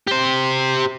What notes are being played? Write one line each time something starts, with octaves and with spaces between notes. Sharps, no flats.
G4 C5